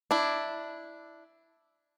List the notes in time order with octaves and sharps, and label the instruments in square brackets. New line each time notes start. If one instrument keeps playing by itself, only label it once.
[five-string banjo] D4 E4